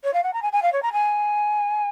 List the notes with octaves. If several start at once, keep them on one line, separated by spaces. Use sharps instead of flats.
C#5
F5
F#5
A#5
G#5
G#5
F5
C#5
A#5
G#5